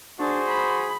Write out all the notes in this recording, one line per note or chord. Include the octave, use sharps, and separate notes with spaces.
D4 F#4 G#4 C5
B5